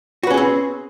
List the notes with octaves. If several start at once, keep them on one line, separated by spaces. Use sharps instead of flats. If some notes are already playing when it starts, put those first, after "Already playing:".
C4 C#4 F#4 G#4 B4